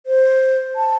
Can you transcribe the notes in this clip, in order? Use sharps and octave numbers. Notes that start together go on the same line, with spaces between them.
C5
A5